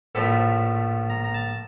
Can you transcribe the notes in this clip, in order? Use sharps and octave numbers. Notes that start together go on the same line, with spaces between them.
A#1 A2 F3 A3 B5
A#5
A#5
A5